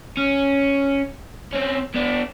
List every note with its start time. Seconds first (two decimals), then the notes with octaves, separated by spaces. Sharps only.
0.17 C#4
1.53 C4 C#4
1.94 B3 D4